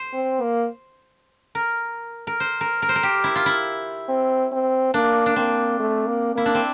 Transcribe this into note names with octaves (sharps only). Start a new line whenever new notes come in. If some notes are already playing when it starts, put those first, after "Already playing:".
Already playing: C5
C4
A#3
A#4
A#4
C5
A#4
A#4
C5
A#4
G4
E4
F4
E4
C4
C4
A#3 D4
D4
A#3 C4
A3
A#3
A#3 E4
D4
C4